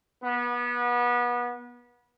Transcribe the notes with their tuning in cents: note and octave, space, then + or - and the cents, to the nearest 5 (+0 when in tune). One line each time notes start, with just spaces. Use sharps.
B3 -25